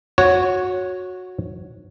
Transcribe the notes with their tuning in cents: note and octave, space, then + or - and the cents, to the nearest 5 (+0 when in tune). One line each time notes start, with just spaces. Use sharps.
F#4 -15 C#5 +0